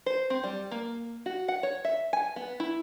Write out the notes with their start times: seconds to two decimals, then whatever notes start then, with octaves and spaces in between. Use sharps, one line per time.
0.06 C5
0.30 C4
0.44 G3
0.71 A#3
1.26 F#4
1.48 F#5
1.63 C#5
1.85 E5
2.13 G#5
2.36 B3
2.60 E4